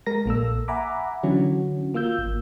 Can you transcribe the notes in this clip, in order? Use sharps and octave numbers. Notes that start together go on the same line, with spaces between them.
G#3 A#4 A#6
A#1 A#3 A4 E6
E5 F#5 G#5 A#5 B5 D6
D3 E3 F#3 C#4 F#4
A#3 F4 E6 G6
G#1